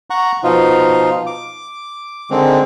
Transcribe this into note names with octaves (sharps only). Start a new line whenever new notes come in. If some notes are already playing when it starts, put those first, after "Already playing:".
F#5 A#5 C#6
B2 F3 D#4 F4
D6
D3 D#3 G#3 C4